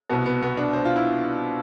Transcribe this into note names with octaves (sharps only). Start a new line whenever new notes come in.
C2 B2 B3
B3
B3
D4
C5
F4
E4